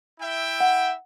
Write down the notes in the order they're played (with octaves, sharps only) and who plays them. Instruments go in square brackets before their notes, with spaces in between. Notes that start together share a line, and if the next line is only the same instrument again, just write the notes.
[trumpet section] E4 E5 G5
[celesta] F#5